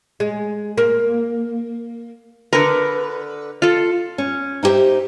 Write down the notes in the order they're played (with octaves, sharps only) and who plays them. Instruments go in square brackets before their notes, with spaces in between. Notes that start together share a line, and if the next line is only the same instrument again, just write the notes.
[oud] G#3
A#3
[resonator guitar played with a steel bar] D3 B4 [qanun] A#4
[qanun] F4 A4
[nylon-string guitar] C#4
D#4 E4 G4 C5 E5